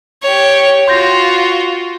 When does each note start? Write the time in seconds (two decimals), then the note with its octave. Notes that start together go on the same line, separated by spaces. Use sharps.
0.22 G4 C#5
0.88 F4 F#4 C6 G6 A#6